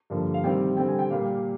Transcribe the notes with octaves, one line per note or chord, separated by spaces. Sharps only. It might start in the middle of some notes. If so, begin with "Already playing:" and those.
G2 D3 F3 A#3
F5
C3 D#3 G3 C4 G5
D3 G3 C4 G5
G#5
G5
A#2 G3 A#3 F5